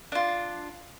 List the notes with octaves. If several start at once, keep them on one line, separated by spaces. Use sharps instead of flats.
D4 F4